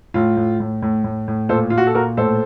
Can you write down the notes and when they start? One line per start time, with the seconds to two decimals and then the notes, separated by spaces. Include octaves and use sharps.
0.14 A2 F4
0.37 A2
0.60 A2
0.82 A2
1.04 A2
1.28 A2
1.49 A#2 A4 C5
1.70 A#2 F4
1.78 F#4
1.87 A4
1.94 A#2 F#4 A#4
2.17 A2 A4 C5